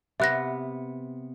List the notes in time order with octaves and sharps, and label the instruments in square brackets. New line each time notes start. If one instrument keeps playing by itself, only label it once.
[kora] C3 B3 [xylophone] E5 F#6 A#6